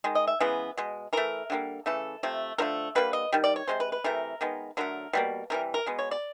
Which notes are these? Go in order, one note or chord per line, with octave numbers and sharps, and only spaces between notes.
D#3 G#3
D#5
E5
C#3 E3 G#3 B3
B2 G#3
E3 A3 A#4
D3 G3 A#3
C#3 E3 A3 A4
C3 F3 A3
D3 F3 A3 A#4
D3 G3 A#3 B4
D#5
D#3 G3
D5
C#5
C3 F3 G#3 C5
B4
B4
C3 E3 A3 A#4
D#3 G#3 B3
D3 F#3 A3 A#4
B2 G3 A#3
C3 E3 G3 A#4
A#4
B2 G#3 B3
C#5
D5